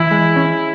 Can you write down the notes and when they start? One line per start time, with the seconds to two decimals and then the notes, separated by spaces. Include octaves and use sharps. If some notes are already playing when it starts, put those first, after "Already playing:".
Already playing: E3 E4
0.11 G#3
0.36 C#4